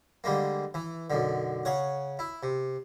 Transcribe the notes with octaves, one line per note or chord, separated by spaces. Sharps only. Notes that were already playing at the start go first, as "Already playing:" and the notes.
D3 G3 G#3 A#3
E3
B1 F#2 D3
C#3 C#5 F#5
E4
C3